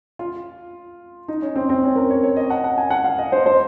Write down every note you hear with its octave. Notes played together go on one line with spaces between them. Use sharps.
F4
D#4
C#4
C4
C4
C#4
A#4
C#5
C#5
D#5
F#5
F#5
G#5
F#5
F5
D#5
C5
C5